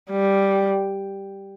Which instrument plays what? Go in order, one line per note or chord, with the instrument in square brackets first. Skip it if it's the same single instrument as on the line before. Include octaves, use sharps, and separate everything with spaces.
[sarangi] G3